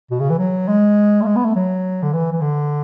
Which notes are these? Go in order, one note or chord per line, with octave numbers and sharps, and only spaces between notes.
B2
C#3
E3
F#3
G#3
A3
G#3
B3
A3
F#3
D3
E3
E3
D3